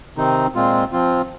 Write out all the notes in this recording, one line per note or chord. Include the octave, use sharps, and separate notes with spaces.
C3 D#3 C4 D#4
A#2 G#3 C4 F4
F3 C4 F4